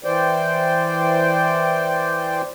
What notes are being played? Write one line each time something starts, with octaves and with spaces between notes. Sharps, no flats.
E3 C5 D5 G5